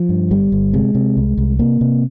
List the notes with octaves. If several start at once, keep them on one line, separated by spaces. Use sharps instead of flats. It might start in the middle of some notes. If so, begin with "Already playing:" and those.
Already playing: F3
G2
G1 G3
G1
C3 G#3
C3
C2
C2
C3 A#3
C3